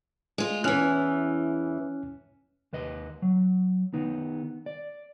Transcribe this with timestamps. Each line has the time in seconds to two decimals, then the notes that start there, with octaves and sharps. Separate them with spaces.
0.38 G#3 F4
0.64 E2 E3 C#4 F6 F#6
2.73 D#2 B4 D#5
3.22 F#3
3.94 D#3 B3 D#4
4.66 D5